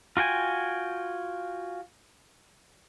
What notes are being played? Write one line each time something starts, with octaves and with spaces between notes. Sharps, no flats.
F4 F#4 G5 G#5